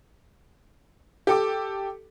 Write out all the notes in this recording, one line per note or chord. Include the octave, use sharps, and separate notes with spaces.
G4 A4 D6